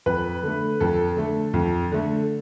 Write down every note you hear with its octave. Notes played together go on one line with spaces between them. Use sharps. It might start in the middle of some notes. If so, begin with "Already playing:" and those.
F2 B4
D3 A3
F2 A4
D3 A3
F2
D3 A3